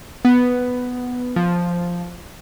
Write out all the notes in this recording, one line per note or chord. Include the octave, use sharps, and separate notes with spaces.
B3
F3